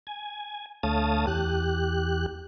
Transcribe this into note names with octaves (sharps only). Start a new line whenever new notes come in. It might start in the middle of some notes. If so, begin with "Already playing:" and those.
G#5
D2 A3 C#5 F5 A5 D#6
E2 G4 F#6